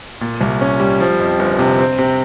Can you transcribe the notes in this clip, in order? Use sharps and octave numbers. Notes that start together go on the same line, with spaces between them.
A#2
C2
C#4
G3
F3
F2
G1
C3
C4
C3